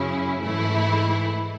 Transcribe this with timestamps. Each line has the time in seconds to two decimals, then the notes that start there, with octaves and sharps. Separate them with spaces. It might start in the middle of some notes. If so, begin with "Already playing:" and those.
Already playing: F#2 C#3 F#3 C#4 E4
0.43 G#2 E3 A3 E4